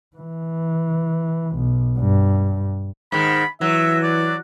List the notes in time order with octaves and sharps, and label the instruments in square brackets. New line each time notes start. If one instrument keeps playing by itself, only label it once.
[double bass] E3
B1
G2
[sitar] G#2 D#3 [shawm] B5
[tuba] E3 [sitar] F#3 [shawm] E5
[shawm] D5